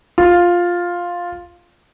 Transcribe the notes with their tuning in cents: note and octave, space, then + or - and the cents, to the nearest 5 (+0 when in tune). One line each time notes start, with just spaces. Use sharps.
F4 +5